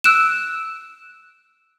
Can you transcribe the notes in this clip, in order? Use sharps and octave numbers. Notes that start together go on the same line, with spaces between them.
E6 F#6 D7 E7